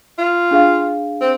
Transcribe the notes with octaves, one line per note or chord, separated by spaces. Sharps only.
F4
D4 G#4 F5
C4